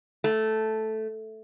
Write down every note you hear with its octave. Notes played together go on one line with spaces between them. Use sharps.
A3